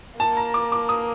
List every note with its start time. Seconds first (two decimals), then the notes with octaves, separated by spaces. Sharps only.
0.19 A#3 A5
0.37 A#5
0.54 D6
0.72 D6
0.89 D#6